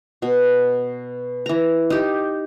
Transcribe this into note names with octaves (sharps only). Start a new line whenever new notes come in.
B2
E3 A#5
D#4 G4